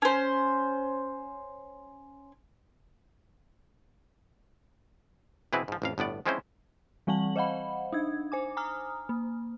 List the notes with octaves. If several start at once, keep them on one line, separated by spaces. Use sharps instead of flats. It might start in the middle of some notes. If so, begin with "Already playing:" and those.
C#4 C5
B2 E3 C4 E4 G#4 B4
G#2 F3
A1 F2 F5
G1 A2 B3 D5
F3 G#3 C4 C#4 E4 C5
E3 G3 C4 F#5 A5 F#7
C5 D#5 F5 F#5 B5
D4 D#4 G#6
C5 G#5 D6
G#5 A#5 D#6 F6
A#3